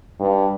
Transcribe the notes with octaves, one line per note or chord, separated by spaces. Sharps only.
G2